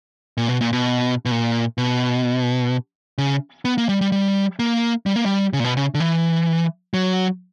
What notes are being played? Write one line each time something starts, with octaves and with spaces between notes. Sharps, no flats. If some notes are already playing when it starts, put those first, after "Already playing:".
A#2
B2
A#2
B2
B2
A#2
B2
C#3
B3
A#3
G3
G3
G3
A#3
G3
A#3
G3
C#3
A#2
B2
C#3
D3
E3
F#3